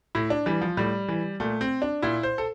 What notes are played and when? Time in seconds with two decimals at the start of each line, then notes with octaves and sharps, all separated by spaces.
0.15 A2 E4
0.30 D4
0.46 E3 G3
0.61 F3
0.77 A2 G3
1.08 E3
1.40 A#2 A3
1.61 C4
1.82 D4
2.02 A#2 E4
2.23 C5
2.38 A4